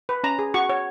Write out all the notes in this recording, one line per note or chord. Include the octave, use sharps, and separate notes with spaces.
B4
C#4 A#5
G#4
F#4 C#6
C#5